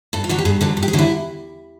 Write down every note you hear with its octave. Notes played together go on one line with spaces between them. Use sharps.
G2 A4
F4
D3 F#3 F#4
G4
G2 G#4
D3 F#3 A4
G2
G4
G#4
D3 F#3
E4